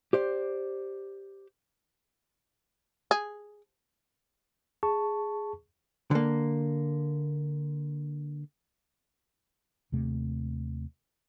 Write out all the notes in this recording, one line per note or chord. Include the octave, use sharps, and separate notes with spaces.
G4 C5 D5
G#4
G#4 A5 C#6
D3 A#3
D#2 C3 A3